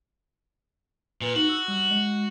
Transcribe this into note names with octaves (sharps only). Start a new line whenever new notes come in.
A#2 B4
D#4 F#4
E6
G3
G#3